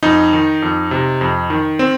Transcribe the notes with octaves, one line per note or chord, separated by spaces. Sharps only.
F2 D#4
D#3
F2
C3
F2
D#3
C4